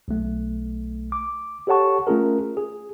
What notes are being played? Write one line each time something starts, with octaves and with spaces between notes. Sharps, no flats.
B1 A3
D6
G4 A4 C#5 F#5 A5 C#6
A3 C#4 F4 G#4 A#4
G#4